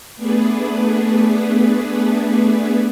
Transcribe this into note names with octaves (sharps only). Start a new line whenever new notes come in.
A3 B3 D4 G#4 B4